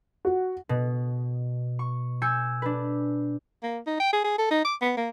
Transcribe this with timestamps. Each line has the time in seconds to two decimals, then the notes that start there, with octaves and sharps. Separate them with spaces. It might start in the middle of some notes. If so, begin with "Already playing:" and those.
0.25 F#4
0.69 B2
1.79 C#6
2.22 G#5 E6 G6 C#7
2.62 D4 B4
3.63 A#3
3.87 D#4
4.00 G5
4.13 G#4
4.24 G#4
4.38 A4
4.51 D#4
4.65 D6
4.81 B3
4.97 A#3